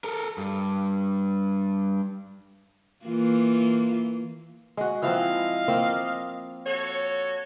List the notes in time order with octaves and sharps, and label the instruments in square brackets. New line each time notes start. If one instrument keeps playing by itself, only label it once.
[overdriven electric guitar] A4 A#4
G2
[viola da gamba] E3 A#3 F4
[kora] G#3 F#4
[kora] E3 F3 C4 [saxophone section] D#5 F5
[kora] A#3 C4 F4
[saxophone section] F#4 A4 C#5